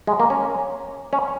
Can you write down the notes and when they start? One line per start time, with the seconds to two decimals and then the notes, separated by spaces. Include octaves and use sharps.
0.07 G#3
0.20 A#3
0.30 C#4
1.13 C#4